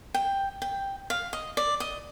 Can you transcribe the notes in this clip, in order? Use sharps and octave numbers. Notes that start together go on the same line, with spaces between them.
G5
G5
F5
D#5
D5
D#5